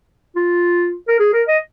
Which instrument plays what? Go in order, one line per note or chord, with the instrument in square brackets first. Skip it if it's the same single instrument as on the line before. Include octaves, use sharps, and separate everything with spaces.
[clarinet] F4
A#4
G#4
A#4
D#5